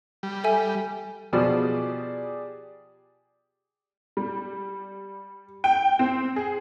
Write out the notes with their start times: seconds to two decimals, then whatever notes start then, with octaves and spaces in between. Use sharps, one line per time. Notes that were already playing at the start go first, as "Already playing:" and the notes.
0.23 G3
0.44 A4 E5 G#5
1.33 B2 F3 G4 G#4 D5
4.17 G3
5.64 G5
5.99 C4
6.36 G#4